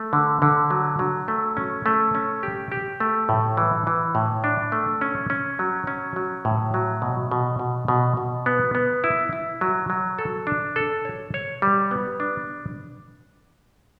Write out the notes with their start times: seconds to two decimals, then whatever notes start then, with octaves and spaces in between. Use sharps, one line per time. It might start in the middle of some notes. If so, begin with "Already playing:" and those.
Already playing: A3
0.13 D3
0.42 D3
0.70 F#3
0.99 F#3
1.28 A3
1.57 C#4
1.86 A3
2.15 C#4
2.43 G4
2.72 G4
3.00 A3
3.29 A2
3.57 E3
3.87 E3
4.15 A2
4.44 D4
4.72 A3
5.01 C#4
5.30 C#4
5.59 F#3
5.87 C#4
6.16 F#3
6.45 A2
6.74 F#3
7.02 B2
7.31 B2
7.59 B2
7.88 B2
8.17 B2
8.46 B3
8.75 B3
9.04 E4
9.33 E4
9.61 F#3
9.90 F#3
10.19 A4
10.47 D4
10.76 A4
11.05 C#5
11.34 C#5
11.62 G3
11.91 B3
12.20 D4